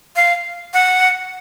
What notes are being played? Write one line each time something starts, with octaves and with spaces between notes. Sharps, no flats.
F5
F#5